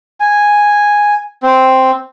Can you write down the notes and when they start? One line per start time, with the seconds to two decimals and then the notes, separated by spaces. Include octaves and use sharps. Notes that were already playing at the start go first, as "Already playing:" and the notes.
0.20 G#5
1.43 C4